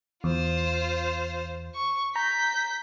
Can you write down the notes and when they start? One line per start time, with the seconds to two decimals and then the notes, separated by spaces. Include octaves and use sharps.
0.24 E2 F4 C5
1.75 C#6
2.16 A#5 G6 B6